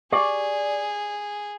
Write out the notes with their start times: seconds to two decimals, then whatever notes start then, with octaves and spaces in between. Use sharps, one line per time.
0.12 G4 G#4 D5